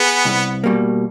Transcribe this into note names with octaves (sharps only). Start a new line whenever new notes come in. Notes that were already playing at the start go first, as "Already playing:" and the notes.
Already playing: B3 G#4
C2
B2 G3 A#3